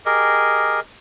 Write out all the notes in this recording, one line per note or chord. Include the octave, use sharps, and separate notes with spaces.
G4 G#4 A#4 D#5